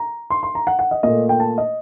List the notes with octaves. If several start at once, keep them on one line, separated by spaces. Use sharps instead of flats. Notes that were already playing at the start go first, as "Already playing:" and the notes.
Already playing: A#5
C6
C6
A#5
F#5
F#5
D#5
A#2 A3 D#5
G5
A5
D#5